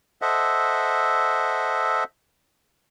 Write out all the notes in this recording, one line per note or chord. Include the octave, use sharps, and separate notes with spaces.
A4 C5 D#5 E5 F#5